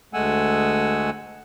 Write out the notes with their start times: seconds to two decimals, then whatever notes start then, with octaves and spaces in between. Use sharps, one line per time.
0.14 D2 G#3 A3 F#5 G#5 E6